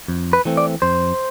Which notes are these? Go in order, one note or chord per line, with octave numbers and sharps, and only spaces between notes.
F2
B4
E3 A3 C4
D5
F2 C5